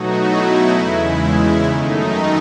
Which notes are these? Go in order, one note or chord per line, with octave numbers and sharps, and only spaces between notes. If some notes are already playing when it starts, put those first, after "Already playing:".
Already playing: B2 F#3 A3 D#4 F#4
E4
E2 C#3 G#3
F#2 D#3 A3 D#4